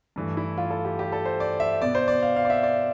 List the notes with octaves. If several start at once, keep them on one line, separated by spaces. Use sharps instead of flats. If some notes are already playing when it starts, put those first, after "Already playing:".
G2 E3 A3
E4
F4
A4
G4
G4
A4
C5
D5
E5
B2 B3 D5
C5
D5
F5
F5
D5
E5
D5